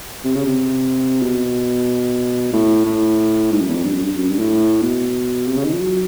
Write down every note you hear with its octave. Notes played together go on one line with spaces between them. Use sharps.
C3
C#3
C3
B2
A2
A2
G#2
F#2
E2
F2
G2
F#2
G2
F#2
G2
A2
B2
C3
C#3
D#3
F3
F#3